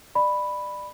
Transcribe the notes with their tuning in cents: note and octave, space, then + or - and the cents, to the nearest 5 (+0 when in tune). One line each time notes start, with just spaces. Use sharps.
D5 +25 B5 +0